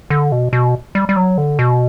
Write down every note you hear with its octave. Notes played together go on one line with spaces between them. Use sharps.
D3
B2
B2
G3
G3
F#3
D3
B2